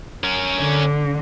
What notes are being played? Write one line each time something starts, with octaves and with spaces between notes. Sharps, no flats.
C#4 A#4
D3